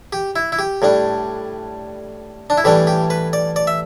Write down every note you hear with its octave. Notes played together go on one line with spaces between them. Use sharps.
G4
E4
E4
G4
A2 G3 D4
D4
E4
A2 E3 G3 D4 G4
G4
B4
D5
D5
E5